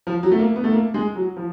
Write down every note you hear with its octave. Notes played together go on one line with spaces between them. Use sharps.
F3
F#3
A3
A#3
B3
A3
A#3
G#3
F#3
F3